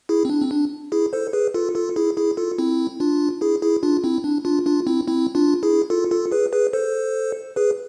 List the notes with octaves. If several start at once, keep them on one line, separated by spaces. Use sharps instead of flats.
E4 G#4
C4
D4
C4
D4
E4 G#4
A4 C5
G#4 B4
F4 A4
F4 A4
E4 G#4
E4 G#4
F4 A4
C4 E4
D4 F4
E4 G#4
E4 G#4
D4 F4
C4 E4
D4
D4 F4
D4 F4
C4 E4
C4 E4
D4 F4
E4 G#4
F4 A4
F4 A4
G#4 B4
G#4 B4
A4 C5
G#4 B4